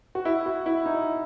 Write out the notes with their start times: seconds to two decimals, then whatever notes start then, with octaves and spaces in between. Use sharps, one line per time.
0.15 F#4
0.25 E4
0.46 F#4
0.66 E4
0.86 D#4